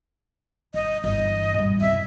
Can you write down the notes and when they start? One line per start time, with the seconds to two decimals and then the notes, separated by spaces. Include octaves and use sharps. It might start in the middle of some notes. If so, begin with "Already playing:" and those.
0.74 G1 D#5
1.04 G1 E3 D#5
1.54 G#2 G3
1.81 C2 F#2 E5